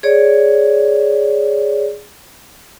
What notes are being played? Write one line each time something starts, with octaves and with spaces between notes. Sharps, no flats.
G#4 C#5 D5